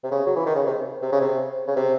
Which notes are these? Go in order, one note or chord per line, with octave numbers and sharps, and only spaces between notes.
C3
C#3
F#3
E3
D#3
C#3
C3
C3
C#3
C3
C#3
C3